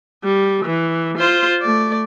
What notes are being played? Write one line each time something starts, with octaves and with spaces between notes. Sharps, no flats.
G3
E3
F4 C5
A3 D5